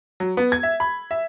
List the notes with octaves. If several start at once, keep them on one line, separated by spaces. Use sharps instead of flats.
F#3
B3
G#6
E5
B5
E5